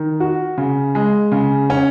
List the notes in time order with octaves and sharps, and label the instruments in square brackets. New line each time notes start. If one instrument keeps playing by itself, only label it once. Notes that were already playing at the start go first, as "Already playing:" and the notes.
Already playing: [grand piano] D#3
F#4
C#3
G#3
C#3
C#4